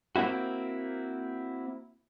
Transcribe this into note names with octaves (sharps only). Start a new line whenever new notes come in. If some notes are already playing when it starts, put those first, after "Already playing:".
A#3 C4 E4 F#4